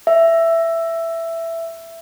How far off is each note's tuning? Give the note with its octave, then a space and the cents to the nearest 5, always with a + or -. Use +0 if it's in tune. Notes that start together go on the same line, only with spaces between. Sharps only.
E5 +10